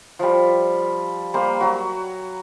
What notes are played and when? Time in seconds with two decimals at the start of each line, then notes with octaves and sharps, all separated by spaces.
0.19 F3 G3
1.34 G3 A#3 C5 C6
1.59 F#3 F#4 B5